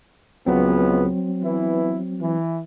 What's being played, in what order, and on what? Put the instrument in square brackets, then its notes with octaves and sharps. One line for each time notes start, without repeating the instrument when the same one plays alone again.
[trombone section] C#2 B3 [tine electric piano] F#3 C4
[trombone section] E3 B3 E4
E3